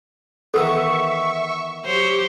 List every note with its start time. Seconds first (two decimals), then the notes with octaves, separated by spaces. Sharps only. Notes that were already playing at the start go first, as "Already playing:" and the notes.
0.54 D#3 E3 B3 A4 E5 C#6 E6
1.85 F#3 G4 C5 C#5